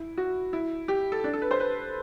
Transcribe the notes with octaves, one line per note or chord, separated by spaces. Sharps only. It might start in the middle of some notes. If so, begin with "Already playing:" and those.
Already playing: E4
F#4
E4
G4
A4
D4
A4
B4
C5
B4